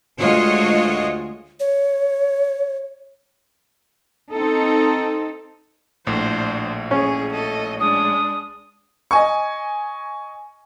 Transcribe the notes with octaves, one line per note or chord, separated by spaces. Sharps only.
D2 G#3 F4 F#4 C#5 D#5
C#5
C4 D#4 A4
A#1 A2 D4 C5
C#4 G#4
A4 D#5
G#3 D4 D#6
D#5 G#5 C#6